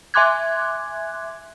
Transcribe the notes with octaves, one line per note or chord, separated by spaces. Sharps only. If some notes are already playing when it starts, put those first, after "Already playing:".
E5 G#5 C6 D6 F#6 G#6